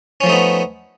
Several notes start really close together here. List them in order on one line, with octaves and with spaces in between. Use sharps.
C#4 F3 A3 D#4 B3